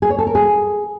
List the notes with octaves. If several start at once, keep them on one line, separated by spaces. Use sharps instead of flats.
G#4
C#5
A4
A#4
G#4